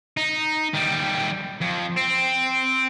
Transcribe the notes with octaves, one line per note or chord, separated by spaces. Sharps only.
D#4
D#3 G3
F2
C4